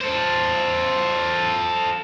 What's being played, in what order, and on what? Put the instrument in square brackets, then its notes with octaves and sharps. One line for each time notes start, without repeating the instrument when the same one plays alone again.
[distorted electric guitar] A4 C5